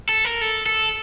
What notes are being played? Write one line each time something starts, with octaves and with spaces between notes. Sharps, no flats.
A4
A#4
A4
A4